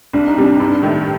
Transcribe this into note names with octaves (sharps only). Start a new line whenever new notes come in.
C2 D4
D#4
C3 G3 D4
G2 D#4
D4
D#3 A3